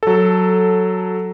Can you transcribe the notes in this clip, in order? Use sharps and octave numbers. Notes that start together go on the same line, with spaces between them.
F#3 A4